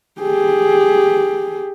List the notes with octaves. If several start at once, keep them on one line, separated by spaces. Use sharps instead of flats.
G4 G#4